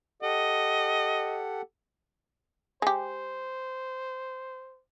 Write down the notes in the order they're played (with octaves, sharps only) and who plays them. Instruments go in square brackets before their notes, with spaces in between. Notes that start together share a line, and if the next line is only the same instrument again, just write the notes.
[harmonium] G4 A4 F#5 [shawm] D#5
[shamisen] G#3 G4 [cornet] C5